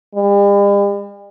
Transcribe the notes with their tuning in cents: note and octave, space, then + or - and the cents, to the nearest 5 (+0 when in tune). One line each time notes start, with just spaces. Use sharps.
G3 +45